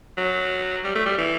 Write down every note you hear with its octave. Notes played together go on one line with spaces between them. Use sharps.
F#3
G3
A3
G3
E3